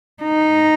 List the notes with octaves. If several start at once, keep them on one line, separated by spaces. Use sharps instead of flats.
D#4